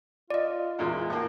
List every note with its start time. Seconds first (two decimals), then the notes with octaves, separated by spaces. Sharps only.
0.30 F4 D5 D#5
0.79 E2 A#2 G#3
1.10 A2 A#3